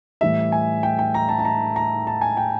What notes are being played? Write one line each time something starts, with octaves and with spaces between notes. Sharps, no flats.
A2 E3 G3 E5
G#5
G5
G5
A#5
A5
A5
A#5
A#5
A5
G#5
G5